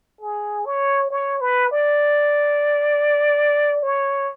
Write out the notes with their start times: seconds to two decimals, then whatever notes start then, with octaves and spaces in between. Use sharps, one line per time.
0.21 G#4
0.66 C#5
1.10 C#5
1.41 B4
1.71 D5
3.83 C#5